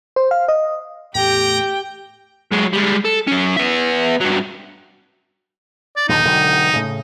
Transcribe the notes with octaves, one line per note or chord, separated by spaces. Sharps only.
C5
F5
D#5
E2 A2 A3 G4 G5 A#5
F#3 G#3
G3 G#3
A4
F#3 C#4
B3 E5
G2 F#3
D5
A#1 D#2 D3 D#4
E1 D3 F#3
A2 C#3